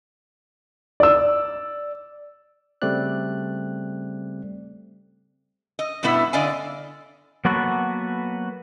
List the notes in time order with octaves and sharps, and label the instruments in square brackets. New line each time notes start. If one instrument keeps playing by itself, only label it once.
[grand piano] D5 E6
[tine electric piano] C#3 G3 A3 C4 D5 F#6
[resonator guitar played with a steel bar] D#5
G2 B2 A3 B3 E4
D3 D5 D#5 F5 G#5
[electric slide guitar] F#3 A#3 B3 F#4 A4 B4